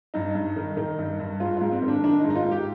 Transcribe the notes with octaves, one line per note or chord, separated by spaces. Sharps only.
G2 D#4
G2
D#3
D#3
G2
G2
G#2 F4
G#2 F4
C4
D#3
D4
D#3 D4
D#4
G#2
D#4
F4
G#2
G4